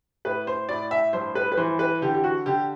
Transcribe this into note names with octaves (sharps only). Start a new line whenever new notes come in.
A2 B4
C5
A2 D5
E5
G2 C5
B4
B4
E3 C5
B4
D3 G4
G4
F#4
D3 G4